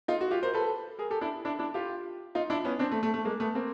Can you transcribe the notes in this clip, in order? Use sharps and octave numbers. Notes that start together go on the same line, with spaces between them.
D#4 F4
F#4
F4 G4
A#4 C5
A4 B4
G#4 A#4
G4 A4
D4 E4
D4 E4
D4 E4
F4 G4
D#4 F4
D4 E4
B3 C#4
C4 D4
A3
A3
A3
G#3 A#3
A3 B3
A#3 C4